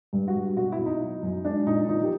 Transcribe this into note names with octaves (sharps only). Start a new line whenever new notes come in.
G2
F#4
G2
B2 F#4
E4
B2
D#4
F#3
F#2
G#3 D4
A#2 D#4
F3 D#4
G4